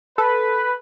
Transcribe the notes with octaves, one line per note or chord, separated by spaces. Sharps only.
A4 B4